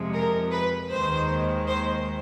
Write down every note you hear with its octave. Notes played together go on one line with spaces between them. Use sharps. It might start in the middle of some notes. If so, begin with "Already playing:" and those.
Already playing: F2 C3 F3 G#3
A#4
B4
D#2 D#3 G#3 C5
C5